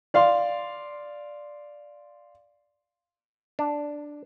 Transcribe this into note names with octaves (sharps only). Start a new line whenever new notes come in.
D5 F5 C6
D4